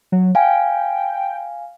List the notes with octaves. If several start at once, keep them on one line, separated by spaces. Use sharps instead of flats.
F#3
F5 G5 G#5